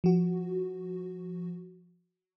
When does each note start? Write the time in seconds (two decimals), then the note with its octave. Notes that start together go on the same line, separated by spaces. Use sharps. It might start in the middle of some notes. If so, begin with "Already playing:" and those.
0.04 F3 F#4